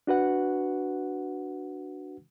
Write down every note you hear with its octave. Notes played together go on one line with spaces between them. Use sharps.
D4 F#4 B4 F#5